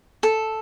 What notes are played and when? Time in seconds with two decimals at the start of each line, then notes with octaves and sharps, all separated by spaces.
0.23 A4